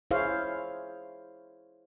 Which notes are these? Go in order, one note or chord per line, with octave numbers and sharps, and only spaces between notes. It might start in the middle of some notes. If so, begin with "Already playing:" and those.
E4 G#4 C5 C#5 F5